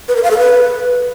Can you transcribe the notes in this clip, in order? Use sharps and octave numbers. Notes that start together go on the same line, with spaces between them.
B4
A#4
F5
A4
B4